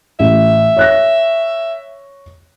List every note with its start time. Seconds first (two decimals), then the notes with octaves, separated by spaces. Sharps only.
0.20 A1 E5
0.77 C#5 F#6 A#6